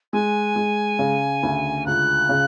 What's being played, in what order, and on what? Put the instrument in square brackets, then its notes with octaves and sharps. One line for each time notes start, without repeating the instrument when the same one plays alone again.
[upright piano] G#3 [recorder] G#5
[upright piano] G#3
C#3
D2
[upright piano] C#2 [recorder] F#6
[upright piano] C#3